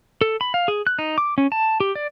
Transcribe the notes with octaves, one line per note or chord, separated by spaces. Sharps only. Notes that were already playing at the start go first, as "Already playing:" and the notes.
A4
B5
F5
G#4
F#6
D#4
D6
C#4
A5
G4
D5